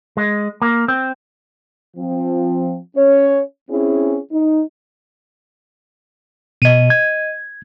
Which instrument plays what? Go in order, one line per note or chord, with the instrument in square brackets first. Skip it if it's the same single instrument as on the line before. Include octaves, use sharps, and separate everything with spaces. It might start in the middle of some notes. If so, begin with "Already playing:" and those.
[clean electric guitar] G#3
A#3
C4
[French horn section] F3 C4
C#4 C#5
C4 C#4 E4 G#4
D#4
[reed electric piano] B2 [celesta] D#5 D#7
[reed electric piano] G#6